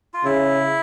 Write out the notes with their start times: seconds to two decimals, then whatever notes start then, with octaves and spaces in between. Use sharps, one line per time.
0.14 F4
0.25 C#3 E4